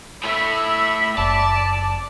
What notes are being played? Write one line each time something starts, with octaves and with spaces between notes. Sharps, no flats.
A2 A3 E5 B5
F#1 D5 A5